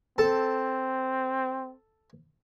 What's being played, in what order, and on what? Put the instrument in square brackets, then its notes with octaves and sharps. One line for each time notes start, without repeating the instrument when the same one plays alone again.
[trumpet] C4 [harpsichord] A4